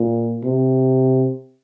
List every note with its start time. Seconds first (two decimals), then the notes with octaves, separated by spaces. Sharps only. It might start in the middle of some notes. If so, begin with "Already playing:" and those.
Already playing: A#2
0.44 C3